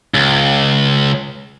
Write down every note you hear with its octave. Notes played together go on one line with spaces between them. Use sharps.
C#2